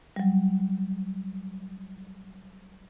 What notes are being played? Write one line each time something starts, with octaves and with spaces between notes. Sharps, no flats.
F#3 G3